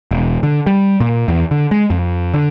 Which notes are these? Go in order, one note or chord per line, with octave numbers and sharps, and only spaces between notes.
E1
D3
G3
A#2
E2
D3
G#3
F2
D3